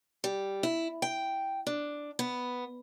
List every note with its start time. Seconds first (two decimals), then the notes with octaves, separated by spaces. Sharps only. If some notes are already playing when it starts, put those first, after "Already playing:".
0.24 G3
0.63 E4
1.02 G5
1.67 D4
2.19 B3